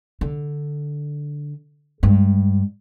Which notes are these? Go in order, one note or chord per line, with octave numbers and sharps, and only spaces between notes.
D3
G2 G#3